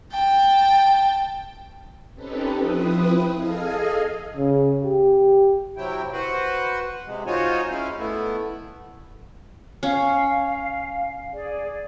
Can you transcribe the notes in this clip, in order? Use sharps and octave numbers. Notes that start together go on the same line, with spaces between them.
G5 A5
C4 C#4 D#4 G4 A4 B4
F3 C4 E4 B4 D#6
G#4 A4 D#5 F5 G#5
C#3
G4
C3 F#3 E4 G5
F#4 B4 C5 F#5
C3 G#3
D#4 F4 F#4 C5 C#5 G#5
G#3 C#4 E4 F5
A3 B3 E4
C#4 F5
G#4 D5